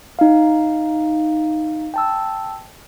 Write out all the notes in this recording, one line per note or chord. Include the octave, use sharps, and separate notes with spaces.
D#4 F5
G5 A5 E6